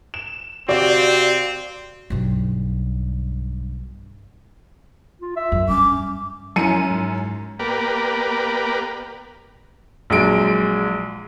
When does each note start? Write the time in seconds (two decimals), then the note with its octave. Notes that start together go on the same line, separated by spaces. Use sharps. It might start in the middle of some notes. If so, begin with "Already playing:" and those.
0.14 E7
0.69 C3 C4 F#4 G4 D5 F5
2.10 B1 G2
5.22 F4
5.36 E5
5.52 F#2
5.69 G2 C#4 D6
6.56 F#2 C#4 E4 C6 C#7 D#7
6.91 G#2
7.59 A#3 B3 G4 A#4 B4 D5
10.10 A#1 F#3 G#3 D7